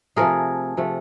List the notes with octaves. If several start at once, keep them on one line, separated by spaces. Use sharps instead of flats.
C3 F3 A3 G#4 A#4
C3 F3 A3